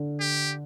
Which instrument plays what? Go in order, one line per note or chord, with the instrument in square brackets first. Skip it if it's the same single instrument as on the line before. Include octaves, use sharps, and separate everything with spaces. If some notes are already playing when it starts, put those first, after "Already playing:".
Already playing: [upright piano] D3
[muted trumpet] G4